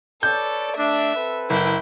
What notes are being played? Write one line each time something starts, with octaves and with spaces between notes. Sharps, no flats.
A4 B4 C#5 D5 G6
A3 D4 E5
C4 A4 B4
F#1 E4 G5